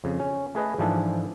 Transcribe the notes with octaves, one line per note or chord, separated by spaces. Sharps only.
F2 C#3
C#4
A3 G#4 B4 D#5
G#2 E3 F3 D4 G#4 A4